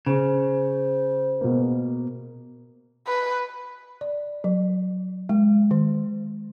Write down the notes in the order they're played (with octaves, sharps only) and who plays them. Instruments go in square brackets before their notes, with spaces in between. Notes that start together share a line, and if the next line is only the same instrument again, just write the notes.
[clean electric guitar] C#3 [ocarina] C5
[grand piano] B2 A#3
[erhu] B4
[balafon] D5
F#3
G#3
D#3